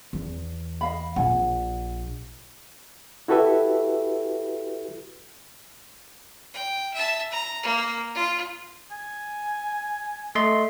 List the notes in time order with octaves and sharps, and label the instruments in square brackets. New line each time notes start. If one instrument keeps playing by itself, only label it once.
[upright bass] E2
[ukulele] D#5 F5 B5
[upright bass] A#1 [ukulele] F#5 G#5
[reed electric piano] E4 F#4 G4 A4 B4 E5
[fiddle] G5
E5 A5
A#5
A#3
F4
[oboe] G#5
[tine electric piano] A3 D#5 C6